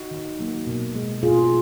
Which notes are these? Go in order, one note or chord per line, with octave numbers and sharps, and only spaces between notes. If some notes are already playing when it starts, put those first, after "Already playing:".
Already playing: D#4 F#4
D#3
F#3 A#3
B2
G#3
B2 F4 G#4